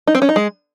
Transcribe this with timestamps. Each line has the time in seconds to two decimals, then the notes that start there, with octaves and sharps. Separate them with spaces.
0.07 D#4
0.15 C4
0.22 C#4
0.29 D#4
0.36 G#3